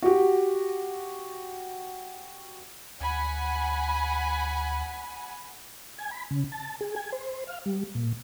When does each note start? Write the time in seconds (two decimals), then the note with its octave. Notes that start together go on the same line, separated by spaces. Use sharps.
0.02 F#4 G4
3.00 D2 F#5 G#5 B5
5.98 G#5
6.11 B5
6.30 C#3
6.52 A5
6.81 G#4
6.96 G#5
7.12 C5
7.47 F5
7.66 G3
7.95 A#2